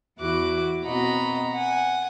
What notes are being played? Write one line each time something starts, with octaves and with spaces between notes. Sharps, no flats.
E2 E4 F#4 D6 F#6
B2 C4 F#4 D#5 A#5 B5
F#5 G#5